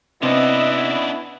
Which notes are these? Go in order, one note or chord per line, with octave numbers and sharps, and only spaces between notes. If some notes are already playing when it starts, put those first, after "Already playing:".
C3 B3 C#4 D4 E4 D#5